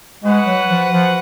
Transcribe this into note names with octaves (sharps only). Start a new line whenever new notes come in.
G#3 F#4 B4 F#5
F#3
F3
F3